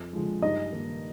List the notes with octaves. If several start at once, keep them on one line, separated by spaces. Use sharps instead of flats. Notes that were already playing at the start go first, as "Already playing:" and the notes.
Already playing: F2
D3 F3 G#3
G2 D#4 D#5
D#3 A#3